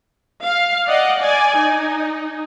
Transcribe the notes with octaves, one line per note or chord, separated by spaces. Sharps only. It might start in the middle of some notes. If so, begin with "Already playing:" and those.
F5
D5 D#5 F#5
D5 G#5
D#4